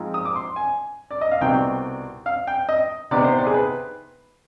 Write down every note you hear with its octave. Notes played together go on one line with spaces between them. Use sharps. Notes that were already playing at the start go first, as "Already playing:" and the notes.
Already playing: G#2 F3 G#3 C4 D#4
D#6
D6
C6
G#5
D5
D#5
F5
C2 B2 G3 C4 D#4 G5
F5
G5
D#5
C3 D#3 B3 D#4 D5
C5
D5
G#4
B4